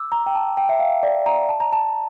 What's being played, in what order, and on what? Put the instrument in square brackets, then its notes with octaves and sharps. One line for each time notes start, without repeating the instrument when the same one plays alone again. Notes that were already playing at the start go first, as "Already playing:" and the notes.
Already playing: [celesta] D6 E6
A#5
G5
A5
G5
E5
F5
D5
A#5
A5
A#5
A5